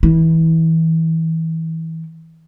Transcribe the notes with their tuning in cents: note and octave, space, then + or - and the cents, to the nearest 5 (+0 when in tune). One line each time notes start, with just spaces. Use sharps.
E3 -25 E4 -20